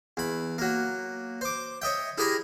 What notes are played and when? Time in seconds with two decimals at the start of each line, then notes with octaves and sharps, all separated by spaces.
0.17 E2 B5
0.58 F#3 A#3
1.41 C5 D6
1.82 C#5 D#5 E5 G5
2.18 E4 G4 G#4 A#4 A#5 B5